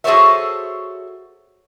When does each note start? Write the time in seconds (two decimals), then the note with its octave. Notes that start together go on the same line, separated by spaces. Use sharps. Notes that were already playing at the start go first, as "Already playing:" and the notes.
0.04 F#4 G#4 A4 C5 C#5 E5